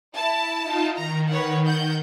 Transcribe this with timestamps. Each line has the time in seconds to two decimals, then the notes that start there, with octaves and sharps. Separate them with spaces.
0.15 E4 A5
0.63 D#4 F4
0.97 D#3 A#5
1.30 B4 C#5 F#5
1.65 F#5 G6